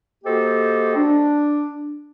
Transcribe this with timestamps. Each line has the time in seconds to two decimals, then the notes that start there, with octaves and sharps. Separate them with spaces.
0.24 A#3 F#4 G4 A4 C5 D#5
0.96 D4